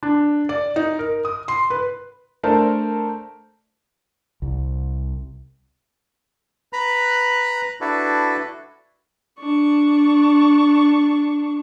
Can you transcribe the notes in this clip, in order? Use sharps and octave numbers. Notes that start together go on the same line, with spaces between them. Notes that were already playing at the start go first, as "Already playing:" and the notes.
D4
D5
D#4
A#4
D#6
C6
B4
A3 D4 A#4 C5 A5
C2
B4 A#5 B5 F#6
D4 E4 F#4 A4 B4
D4 C#6